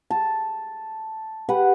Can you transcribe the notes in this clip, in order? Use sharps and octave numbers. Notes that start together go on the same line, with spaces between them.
A5
G4 B4 F#5